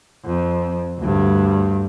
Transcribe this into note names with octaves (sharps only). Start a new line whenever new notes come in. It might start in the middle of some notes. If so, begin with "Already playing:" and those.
F2
D2 G2